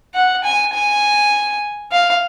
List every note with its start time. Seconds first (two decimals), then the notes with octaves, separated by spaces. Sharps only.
0.15 F#5
0.44 G#5
0.73 G#5
1.92 F5